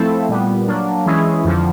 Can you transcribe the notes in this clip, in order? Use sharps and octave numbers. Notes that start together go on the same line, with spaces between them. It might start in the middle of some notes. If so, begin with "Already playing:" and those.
Already playing: F3 A3 C4 E4 A4
A#2 G3 B3
F#3 A#3 D4
E3 G#3 C#4 E4 G#4
F2 D3 F3